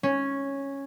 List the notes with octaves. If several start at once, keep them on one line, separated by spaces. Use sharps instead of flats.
C#4